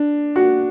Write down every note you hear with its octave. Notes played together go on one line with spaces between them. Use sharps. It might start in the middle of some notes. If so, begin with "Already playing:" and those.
Already playing: D4
F#4